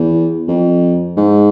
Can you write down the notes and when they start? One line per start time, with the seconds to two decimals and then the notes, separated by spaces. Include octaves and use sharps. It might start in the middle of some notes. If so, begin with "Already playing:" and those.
Already playing: E2
0.48 F2
1.17 G#2